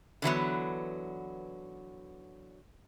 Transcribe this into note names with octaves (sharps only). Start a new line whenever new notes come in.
D3 E3 F#3 B3